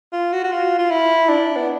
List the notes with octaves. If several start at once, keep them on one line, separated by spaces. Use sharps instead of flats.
F4
F#4
F#4
F4
F4
E4
D4
B3